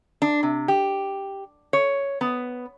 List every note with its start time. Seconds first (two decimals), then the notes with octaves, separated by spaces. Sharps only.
0.22 D4
0.43 C3
0.68 G4
1.73 C#5
2.21 B3